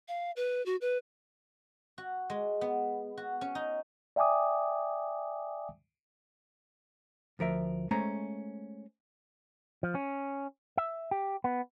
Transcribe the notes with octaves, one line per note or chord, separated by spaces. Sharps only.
F5
B4
F#4
B4
F#4
G#3
B3
F#4
C#4
D#4
D5 E5 G5 G#5 D6 D#6
D2 F3 A#4 E5
G#3 A3 C#4 C5 A#5
F3
C#4
E5
G4
B3